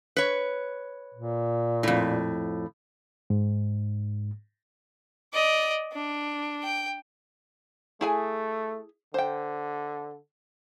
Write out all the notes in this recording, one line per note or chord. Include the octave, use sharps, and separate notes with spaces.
B4 C#5
A#2
F2 A2
G#2
D5 D#5
D4
G5
A3 E4 G#4 G#5
D3 C5 G5